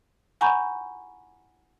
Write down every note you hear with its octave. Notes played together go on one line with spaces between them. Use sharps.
F#5 G#5 A#5 B5 C#6 G6